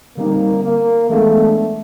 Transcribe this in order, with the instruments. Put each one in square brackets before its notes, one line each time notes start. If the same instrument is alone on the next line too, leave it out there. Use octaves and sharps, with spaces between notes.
[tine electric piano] D3 G3 C4 D#4 [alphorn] A#3
[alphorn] A#3
[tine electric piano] E3 G#3 B3 D4 [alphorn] A3